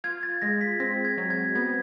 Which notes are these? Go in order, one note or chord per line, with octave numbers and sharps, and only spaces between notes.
F4 G#6
A6
G#3 A#6
B6
C4 A#6
G#6
F#3
G#6
B3 G#6